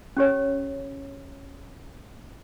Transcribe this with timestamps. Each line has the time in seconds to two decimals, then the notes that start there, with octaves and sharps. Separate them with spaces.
0.17 C#4 G4 C#5